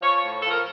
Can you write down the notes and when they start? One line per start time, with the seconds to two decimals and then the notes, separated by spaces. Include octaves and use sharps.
0.02 F3 C#5
0.17 C#5
0.23 A2
0.42 F3 A4
0.49 A#4